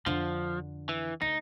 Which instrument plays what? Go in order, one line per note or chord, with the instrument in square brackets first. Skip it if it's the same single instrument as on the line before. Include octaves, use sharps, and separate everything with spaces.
[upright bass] F2 D3 [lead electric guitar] F3
[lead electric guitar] E3
[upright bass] D2 [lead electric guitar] D#4